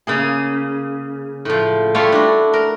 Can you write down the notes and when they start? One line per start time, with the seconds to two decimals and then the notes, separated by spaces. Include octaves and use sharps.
0.07 C#3 A#3 G#4
1.45 A2 F3
1.94 G3 A3 E4 F4 C#5
2.12 D4 F#4
2.53 A#4